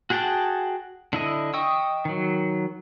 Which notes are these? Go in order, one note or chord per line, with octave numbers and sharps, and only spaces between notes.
F#4 G#4 F#5 G5 A5
D3 E4 D#5
D#5 G5 C#6 D#6 E6
D#3 F#3